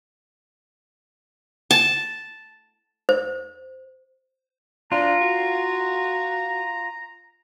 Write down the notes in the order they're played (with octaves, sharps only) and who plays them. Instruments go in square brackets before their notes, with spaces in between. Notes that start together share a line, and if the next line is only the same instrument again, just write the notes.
[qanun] A5
[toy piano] C5
[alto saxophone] D4 [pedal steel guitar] F4 [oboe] A#5
[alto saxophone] F#4